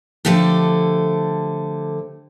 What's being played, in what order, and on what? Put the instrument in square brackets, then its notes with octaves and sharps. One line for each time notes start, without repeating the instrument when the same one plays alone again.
[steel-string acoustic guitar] D3 F3 A3 G4 A4